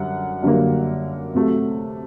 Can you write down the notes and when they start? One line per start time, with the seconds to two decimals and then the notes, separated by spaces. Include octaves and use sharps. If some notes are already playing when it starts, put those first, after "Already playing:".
Already playing: F#2 D3 G3 F#5
0.43 F#2 D3 G3 A#3
1.35 C3 F#3 A3